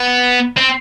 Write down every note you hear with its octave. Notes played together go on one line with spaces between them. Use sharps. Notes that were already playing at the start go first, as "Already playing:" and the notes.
Already playing: B3
C4